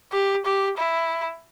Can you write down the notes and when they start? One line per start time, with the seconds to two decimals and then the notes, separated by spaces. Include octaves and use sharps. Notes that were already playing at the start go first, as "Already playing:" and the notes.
0.12 G4
0.45 G4
0.78 E4